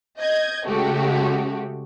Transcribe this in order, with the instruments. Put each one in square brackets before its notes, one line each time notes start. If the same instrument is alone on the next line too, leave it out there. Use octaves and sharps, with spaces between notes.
[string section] D#5 G6 G#6
C#3 G#3 A3 F#4 G4